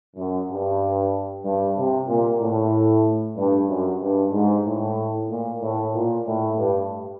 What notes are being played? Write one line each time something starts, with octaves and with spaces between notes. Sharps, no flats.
F#2
G2
G2
C3
A#2
A2
G2
F#2
G2
G#2
A2
A#2
A2
A#2
A2
G2